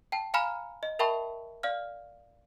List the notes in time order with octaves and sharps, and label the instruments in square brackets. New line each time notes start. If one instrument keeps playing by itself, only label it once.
[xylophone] G5 A5
F5 G#5 A#5 B5 F6 E7
D#5
A#4 E5 G5 A5 B5 C#6
D5 F5 F6